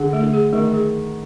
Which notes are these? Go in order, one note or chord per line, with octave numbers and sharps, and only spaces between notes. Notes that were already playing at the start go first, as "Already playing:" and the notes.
Already playing: D3 G#4
A3
D3
G#4
D#3 A3
G#4